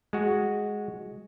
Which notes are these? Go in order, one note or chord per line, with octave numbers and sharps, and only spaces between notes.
G#3 F#4